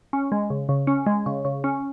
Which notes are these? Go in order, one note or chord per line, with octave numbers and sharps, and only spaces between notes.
C#4
G#3
C#3
C#3
C#4
G#3
C#3
C#3
C#4